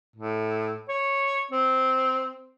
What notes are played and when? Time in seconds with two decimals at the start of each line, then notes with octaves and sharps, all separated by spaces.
0.16 A2
0.89 C#5
1.52 C4